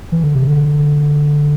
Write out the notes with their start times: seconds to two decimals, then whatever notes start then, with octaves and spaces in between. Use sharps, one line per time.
0.12 E3
0.23 D3
0.35 C3
0.47 D3